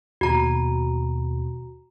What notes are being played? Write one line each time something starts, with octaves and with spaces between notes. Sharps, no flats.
D#2 B2 F#4 A#5